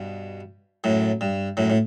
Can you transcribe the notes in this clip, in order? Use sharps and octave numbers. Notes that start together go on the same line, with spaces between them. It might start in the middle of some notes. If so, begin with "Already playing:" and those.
Already playing: G2 B2
F#2 A2
G2
F#2 A2
A2